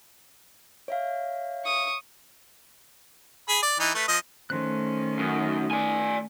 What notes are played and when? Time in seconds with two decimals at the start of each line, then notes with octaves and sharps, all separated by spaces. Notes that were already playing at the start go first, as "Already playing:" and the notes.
0.88 C#5 E5 F5
1.65 C#6 D#6
3.49 G#4 B5
3.63 D5
3.80 E3 D#4
3.95 A3 B4
4.08 F3 D#5
4.50 D#3 A3 C#4 C5 C6 F#6
5.19 F#2 D#4 D#6
5.71 D5 G#5